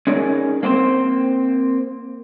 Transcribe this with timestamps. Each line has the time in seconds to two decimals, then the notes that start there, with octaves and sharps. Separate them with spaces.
0.07 C#4 D#4 G#4 A#4 D5
0.63 A#3 C4 F4 C5